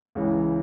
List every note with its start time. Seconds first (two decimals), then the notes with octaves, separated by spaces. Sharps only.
0.15 C#2 C#3 E3